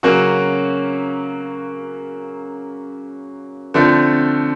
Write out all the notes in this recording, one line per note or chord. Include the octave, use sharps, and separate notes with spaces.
C#3 F#3 A#3 C#4 F#4
D3 F3 A3 C4